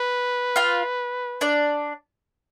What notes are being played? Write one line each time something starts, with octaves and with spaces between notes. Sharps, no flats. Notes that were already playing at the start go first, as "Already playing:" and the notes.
Already playing: B4
F4 F5
D4 D5